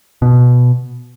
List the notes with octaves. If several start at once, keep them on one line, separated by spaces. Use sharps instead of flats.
B2